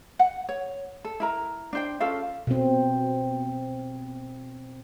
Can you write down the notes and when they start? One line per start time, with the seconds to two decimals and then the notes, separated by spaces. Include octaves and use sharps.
0.19 F#5
0.49 C#5
1.05 A4
1.20 E4 A#4 A#5
1.73 D4 C5 G5
2.00 C#4 F4 A4 F5
2.47 B2 C4